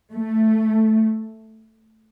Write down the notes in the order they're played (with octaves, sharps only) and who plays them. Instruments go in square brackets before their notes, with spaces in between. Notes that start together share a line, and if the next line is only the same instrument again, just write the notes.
[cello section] A3